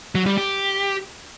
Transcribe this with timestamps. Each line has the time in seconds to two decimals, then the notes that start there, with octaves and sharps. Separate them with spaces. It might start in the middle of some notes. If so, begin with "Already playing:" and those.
0.15 F#3
0.26 G3
0.38 G4